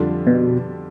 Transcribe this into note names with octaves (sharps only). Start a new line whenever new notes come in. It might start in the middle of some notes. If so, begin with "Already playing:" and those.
Already playing: F2 D3 G3 D4 F4
B2